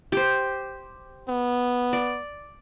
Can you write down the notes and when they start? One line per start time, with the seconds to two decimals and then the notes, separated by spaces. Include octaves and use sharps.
0.12 G4 C5
1.28 B3
1.93 D5